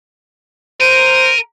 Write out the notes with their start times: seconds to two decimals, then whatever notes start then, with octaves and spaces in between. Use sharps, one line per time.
0.80 A#4 C5 D#7